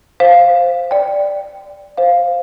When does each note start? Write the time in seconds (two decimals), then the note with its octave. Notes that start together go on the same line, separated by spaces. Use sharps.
0.20 C5 F5
0.91 D5 G5
1.98 C5 F5